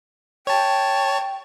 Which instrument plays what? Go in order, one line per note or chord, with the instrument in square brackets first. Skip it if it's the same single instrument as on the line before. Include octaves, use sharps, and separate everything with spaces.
[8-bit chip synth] C#5 A5 [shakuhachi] G5